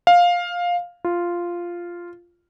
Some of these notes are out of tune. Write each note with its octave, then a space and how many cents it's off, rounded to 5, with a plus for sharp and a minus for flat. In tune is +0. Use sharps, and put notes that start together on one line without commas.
F5 +10
F4 -5